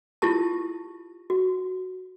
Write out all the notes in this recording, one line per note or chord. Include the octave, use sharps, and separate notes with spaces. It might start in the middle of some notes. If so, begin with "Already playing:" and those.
E4 F4 G4 A5
F#4